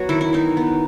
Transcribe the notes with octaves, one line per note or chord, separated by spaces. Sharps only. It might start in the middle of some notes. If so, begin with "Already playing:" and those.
Already playing: F#3 B3 F#4 C#5
D#3 E4
E4
E3 D#4
B3